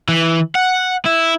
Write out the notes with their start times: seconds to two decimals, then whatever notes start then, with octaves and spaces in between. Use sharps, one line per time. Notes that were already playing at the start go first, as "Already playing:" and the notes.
0.09 E3
0.55 F#5
1.05 E4